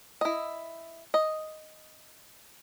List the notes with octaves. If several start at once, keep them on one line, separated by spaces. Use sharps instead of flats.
E4 D#5
D#5